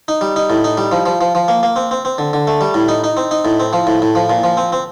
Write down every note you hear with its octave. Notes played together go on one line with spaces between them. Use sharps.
D#4
G3
D#4
A2
D#4
G3
F3
F3
F3
F3
A#3
A#3
C4
C4
C4
D3
D3
A3
G3
A2
D#4
D#4
C4
D#4
A2
C4
F3
A2
A2
F3
A#2
F3
C4
C4